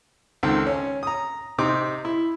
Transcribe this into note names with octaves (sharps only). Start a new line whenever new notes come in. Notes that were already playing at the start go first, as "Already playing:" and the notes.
C#2 D#3 C4 A4
C#4
A#5 D#6
C3 C4 D#4 D6
E4